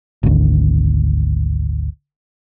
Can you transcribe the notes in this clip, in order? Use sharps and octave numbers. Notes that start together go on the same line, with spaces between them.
G#1 D2